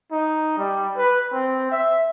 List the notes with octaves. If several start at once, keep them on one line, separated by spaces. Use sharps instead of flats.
D#4
G3
B4
C4
E5